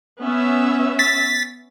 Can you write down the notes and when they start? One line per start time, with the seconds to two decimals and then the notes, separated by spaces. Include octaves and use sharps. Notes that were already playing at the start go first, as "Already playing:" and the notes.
0.21 B3 C#4 E5
0.99 A6 B6